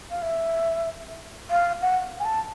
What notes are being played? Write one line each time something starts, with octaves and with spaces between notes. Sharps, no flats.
F5
E5
F5
F#5
G#5
A5